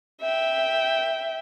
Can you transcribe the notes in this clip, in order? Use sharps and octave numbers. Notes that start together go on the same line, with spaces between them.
E5 G5